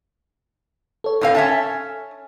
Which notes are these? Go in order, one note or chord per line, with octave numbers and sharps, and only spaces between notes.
A4 C#5
A2 C4 F5
C#4 E5 A5